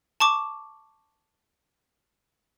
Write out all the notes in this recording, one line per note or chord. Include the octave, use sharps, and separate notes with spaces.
A5 C#6 D6